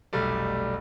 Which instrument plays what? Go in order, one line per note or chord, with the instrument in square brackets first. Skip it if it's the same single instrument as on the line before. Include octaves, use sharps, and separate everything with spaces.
[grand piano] F1 B1 G3 A3 D5